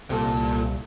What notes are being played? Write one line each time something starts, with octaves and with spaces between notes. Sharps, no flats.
C2 A#2 A4